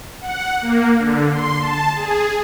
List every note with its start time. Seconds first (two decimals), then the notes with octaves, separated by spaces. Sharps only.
0.21 F#5
0.61 A#3
0.99 D3
1.31 C6
1.60 A5
1.96 G#4